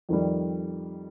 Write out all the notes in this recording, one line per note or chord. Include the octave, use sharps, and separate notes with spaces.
F2 D#3 G3